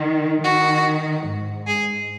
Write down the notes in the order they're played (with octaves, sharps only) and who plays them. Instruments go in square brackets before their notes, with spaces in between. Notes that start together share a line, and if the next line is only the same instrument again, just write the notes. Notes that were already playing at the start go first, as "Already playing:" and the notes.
Already playing: [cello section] D#3
[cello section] D#3 [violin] F#4
[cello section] G#2
[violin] G#4